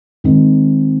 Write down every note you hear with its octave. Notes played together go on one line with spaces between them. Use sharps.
D#3 G#3 C4 D#4